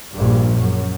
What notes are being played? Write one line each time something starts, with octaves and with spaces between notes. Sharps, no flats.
A#1 G2
F#2